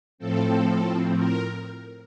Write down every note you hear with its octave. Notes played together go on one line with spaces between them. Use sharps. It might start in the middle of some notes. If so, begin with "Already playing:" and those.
A2 F3 C4 A4
A#4